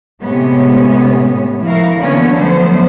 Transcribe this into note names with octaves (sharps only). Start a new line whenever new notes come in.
A2 C3 G#3 B3 C#4
F3 E4 F#4 A#4 F5
D3 E3 F#3 A#3 B3 C#4
F3 F#3 A3 B3 C5